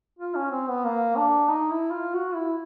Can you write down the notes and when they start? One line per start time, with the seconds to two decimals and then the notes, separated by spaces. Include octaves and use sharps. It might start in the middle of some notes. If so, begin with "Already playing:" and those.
0.19 F4
0.35 C#4
0.51 C4
0.68 B3
0.84 A#3
1.16 D4
1.49 D#4
1.70 E4
1.91 F4
2.14 F#4
2.35 E4